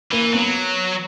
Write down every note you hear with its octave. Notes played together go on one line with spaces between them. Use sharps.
E3 A#3
F#3 B3